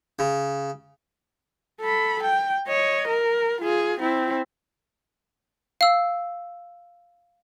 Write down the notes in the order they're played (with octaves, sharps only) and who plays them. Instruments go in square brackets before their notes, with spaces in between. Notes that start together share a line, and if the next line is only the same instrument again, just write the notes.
[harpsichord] C#3
[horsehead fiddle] A4 B5
G5
C#5 D#5
A#4
F4 G#4
C4 E4
[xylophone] F5 E6